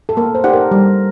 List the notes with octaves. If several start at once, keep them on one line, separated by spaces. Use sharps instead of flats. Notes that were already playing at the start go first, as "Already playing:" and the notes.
A4
A#3 A#4
C5
D#4 G4 D5 F#5
A#4
G3